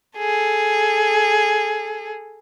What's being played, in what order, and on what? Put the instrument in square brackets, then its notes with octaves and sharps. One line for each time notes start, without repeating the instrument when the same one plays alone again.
[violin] G#4 A4